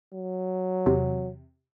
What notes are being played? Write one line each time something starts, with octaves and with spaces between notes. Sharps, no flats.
F#3
E2 C3